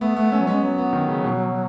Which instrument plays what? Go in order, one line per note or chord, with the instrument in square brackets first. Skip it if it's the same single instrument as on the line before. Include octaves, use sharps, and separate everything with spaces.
[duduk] A3 [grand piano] B3
[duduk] A3 [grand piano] B3
[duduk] A3 [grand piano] C#4
[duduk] F#3
[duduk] G#3 [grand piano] C#4
[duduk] F#3 [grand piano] B3
[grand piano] B3
D#3
C#3
B2